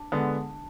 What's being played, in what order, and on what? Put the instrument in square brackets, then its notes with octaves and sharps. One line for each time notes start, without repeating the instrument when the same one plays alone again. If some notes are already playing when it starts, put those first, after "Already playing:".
Already playing: [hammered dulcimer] D4
[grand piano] D3 G#3 B3